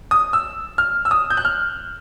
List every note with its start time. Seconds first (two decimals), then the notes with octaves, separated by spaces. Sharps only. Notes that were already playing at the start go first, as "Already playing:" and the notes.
0.11 D#6
0.33 E6
0.78 F6
1.05 E6
1.11 D#6
1.30 G6
1.37 F#6
1.45 F6